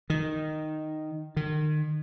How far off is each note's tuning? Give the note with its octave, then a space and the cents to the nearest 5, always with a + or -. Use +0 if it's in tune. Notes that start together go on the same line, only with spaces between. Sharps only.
D#3 -5
D#3 -35